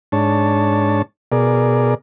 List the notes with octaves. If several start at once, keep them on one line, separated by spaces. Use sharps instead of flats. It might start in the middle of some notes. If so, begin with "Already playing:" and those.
G#2 D4 C#5 A5
B2 G#4 A#4 D5